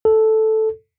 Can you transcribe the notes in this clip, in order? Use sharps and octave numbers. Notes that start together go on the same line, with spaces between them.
A4